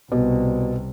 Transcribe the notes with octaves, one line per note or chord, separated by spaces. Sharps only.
C2 B2